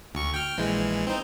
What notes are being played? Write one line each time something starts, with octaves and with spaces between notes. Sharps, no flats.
D2 C#6
G5 F6
A#1 E3 G#3
C4 D#4